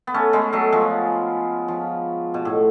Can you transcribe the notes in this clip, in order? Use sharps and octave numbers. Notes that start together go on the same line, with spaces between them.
B3
A3 C#4
G#3 B3
F#3 A3
F3 G#3
F3
B2
A2